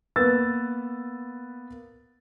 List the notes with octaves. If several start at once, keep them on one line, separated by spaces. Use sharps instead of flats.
A#3 B3 B4 E6 A6